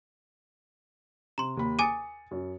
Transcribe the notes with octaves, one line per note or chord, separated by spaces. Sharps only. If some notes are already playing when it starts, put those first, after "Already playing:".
C3 A#5 C6
D#2 B5
G#5 D6 D#6 A6 C#7 D#7
F#2